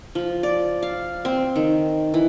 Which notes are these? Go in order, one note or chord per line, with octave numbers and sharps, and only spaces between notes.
F3
D5
F5
C4
D#3
E3